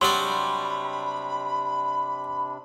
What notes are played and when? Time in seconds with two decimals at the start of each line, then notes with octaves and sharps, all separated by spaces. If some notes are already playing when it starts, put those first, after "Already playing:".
0.01 C3 F#3 G3 D4 D5 B5 C6